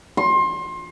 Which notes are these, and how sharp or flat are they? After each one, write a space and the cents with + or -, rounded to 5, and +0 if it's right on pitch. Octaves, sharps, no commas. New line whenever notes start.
C6 +30